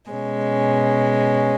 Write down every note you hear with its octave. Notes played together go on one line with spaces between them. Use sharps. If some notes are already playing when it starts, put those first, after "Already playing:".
B2 G#3 C#4